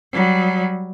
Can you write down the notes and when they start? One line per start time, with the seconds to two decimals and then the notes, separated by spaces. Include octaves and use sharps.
0.13 F#3 G3